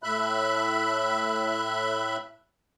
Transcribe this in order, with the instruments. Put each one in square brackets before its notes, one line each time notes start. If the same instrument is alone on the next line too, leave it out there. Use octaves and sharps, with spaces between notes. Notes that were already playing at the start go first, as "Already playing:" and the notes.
[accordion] A2 E5 B5 F#6